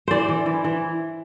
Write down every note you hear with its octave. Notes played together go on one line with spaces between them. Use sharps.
E3 C5 D5
E3
E3
E3